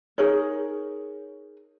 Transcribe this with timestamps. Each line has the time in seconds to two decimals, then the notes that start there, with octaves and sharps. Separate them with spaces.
0.18 D#4 G#4 A#4 C#5